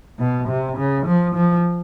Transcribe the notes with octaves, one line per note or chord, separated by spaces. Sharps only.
B2
C3
C#3
F3
F3